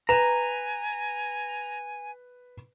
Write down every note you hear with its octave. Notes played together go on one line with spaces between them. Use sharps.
B4 G#5 A#5 E7